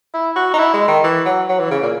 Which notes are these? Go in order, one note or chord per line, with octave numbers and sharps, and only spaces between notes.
E4
F#4
D#4
E4
G#3
D#3
E3
F#3
F#3
E3
C#3
A#2